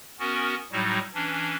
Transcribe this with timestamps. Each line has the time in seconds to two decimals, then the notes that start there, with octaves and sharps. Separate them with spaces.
0.19 B3 C#4 F#4 A#4
0.72 A2 F#3 G3 D#4 F#4
1.14 E3 C#4 D4